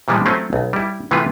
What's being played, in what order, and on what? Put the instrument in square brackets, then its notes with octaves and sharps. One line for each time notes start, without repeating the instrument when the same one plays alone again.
[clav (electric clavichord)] A#2 E3 F3 G3 G#3 B3
F#3 A3 C4 C#4 F4
B1
G3 E4
C3 E3 G#3 A3 F4 B4